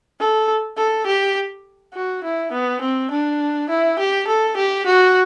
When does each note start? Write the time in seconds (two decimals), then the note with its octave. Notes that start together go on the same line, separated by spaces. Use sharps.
0.20 A4
0.77 A4
1.06 G4
1.94 F#4
2.24 E4
2.52 B3
2.81 C4
3.11 D4
3.69 E4
3.99 G4
4.27 A4
4.57 G4
4.86 F#4